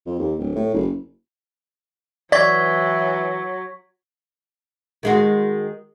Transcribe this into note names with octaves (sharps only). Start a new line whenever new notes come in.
F2
D#2
D1
A2
F#1
E3 F#3 D5 C#6 G#6 B6
D#3 G#3 F#4